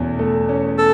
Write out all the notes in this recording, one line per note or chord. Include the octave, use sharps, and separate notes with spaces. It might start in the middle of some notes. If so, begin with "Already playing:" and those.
Already playing: E2 B2 A3 C#4
A3
C#4
A4